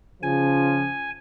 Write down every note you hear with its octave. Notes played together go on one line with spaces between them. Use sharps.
C#3 F3 G#5